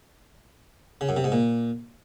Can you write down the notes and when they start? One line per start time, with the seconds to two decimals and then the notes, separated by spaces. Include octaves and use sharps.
1.01 C#3
1.09 F#2
1.17 C3
1.24 G#2
1.32 A#2